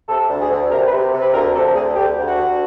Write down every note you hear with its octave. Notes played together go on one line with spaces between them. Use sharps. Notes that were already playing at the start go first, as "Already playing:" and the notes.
C3 A4
D2
G#4
D2
C3 A#4
B4
C3
C5
C3
B4
D2 A#4
C3 A4
D2 G#4
D2 G4
D2
F#4
D2